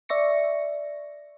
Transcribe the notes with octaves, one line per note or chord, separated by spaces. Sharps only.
D5 E5 C#6 A#6 C#7